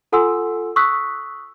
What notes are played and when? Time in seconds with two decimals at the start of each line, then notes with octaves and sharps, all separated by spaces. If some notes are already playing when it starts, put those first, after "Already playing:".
0.12 F4 A4 F#5 G#5 C6 E6
0.76 C#6 D#6 E6 F#6 B6